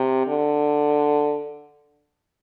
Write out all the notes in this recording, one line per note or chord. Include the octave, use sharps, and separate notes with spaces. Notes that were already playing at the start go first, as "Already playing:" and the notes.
Already playing: C3
D3